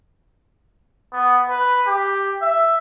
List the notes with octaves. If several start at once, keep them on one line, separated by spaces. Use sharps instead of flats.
B3
B4
G4
E5